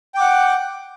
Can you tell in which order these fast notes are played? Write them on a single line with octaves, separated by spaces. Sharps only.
G5 D6 F#5